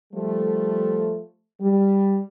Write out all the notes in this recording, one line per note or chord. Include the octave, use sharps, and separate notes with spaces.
F3 G3 A3
G3